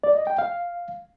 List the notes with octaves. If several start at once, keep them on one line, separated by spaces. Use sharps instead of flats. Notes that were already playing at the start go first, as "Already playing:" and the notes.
D5
D#5
G5
F5